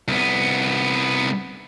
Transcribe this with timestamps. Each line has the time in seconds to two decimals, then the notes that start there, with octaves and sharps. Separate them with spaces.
0.08 C2 B3